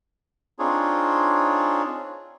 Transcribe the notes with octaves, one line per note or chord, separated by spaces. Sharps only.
C4 D4 D#4 F4 G#4 C#5